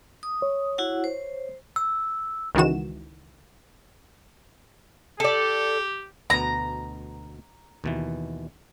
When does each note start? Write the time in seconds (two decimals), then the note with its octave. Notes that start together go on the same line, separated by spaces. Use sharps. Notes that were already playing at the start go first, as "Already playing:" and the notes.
0.23 D#6
0.42 C#5
0.78 E4 F#4 F#5
1.04 C5
1.76 E6
2.55 C#2 D#3 E3 F#4 E7
5.20 G4 A4 D5
6.30 D2 B2 B3 A#5
7.84 D#2 B2 E3